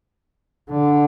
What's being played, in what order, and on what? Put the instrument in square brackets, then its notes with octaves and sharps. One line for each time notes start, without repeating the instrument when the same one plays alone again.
[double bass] D3